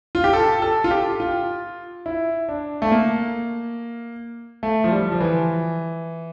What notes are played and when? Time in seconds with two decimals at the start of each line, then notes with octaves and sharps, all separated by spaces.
0.15 F4
0.24 G4
0.33 A4
0.62 A4
0.84 F4
0.91 G4
1.20 F4
2.06 E4
2.49 D4
2.82 A3
2.92 A#3
4.63 A3
4.84 F3
4.92 G3
5.12 F3
5.20 E3